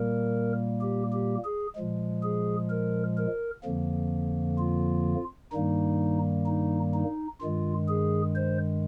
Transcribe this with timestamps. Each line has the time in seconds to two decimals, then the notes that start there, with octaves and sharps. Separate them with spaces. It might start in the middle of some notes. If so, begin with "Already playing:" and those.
Already playing: A#2 G3 A#3 A#4
0.81 G4
1.13 G4
1.45 G#4
1.76 A#2 F3 G#3
2.23 G#4
2.70 A#4
3.18 A#4
3.64 F2 D3 F3 A#3
4.59 F4
5.53 G2 D#3 G3 A#3 D#4
6.47 D#4
6.95 D#4
7.41 G2 D#3 G#3 F4
7.88 G#4
8.36 C5